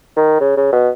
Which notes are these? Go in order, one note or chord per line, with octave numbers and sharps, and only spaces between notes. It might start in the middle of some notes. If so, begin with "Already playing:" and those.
D#3
C#3
C#3
B2